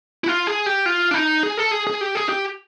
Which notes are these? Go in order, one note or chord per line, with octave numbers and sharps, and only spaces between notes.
E4
F4
G#4
G4
F4
D4
D#4
G#4
A4
G#4
G#4
G4
G#4
G4